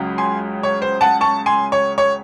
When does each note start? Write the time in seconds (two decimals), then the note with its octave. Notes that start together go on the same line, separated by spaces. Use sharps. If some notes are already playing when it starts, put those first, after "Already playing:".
Already playing: C#2 C#3 F#3
0.18 G#5 C6
0.63 C#5
0.82 C5
1.01 F#5 A5
1.21 A5 C#6
1.46 G#5 C6
1.72 C#5
1.98 C#5